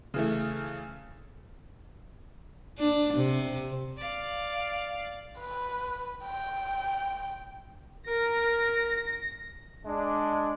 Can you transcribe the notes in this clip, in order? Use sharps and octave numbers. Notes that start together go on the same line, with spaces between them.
C#3 E3 A3
D4
C3
D5 F5
B4
G5
A#4 A#6
G#3 D4